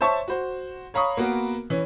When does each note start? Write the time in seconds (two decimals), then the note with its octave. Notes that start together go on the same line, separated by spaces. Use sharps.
0.01 C5 C#5 E5 A5 C#6
0.28 F#4 C5
0.94 C#5 F5 A#5 B5 C#6 D#6
1.17 A#3 B3 F#4 A#4
1.70 E3 C#4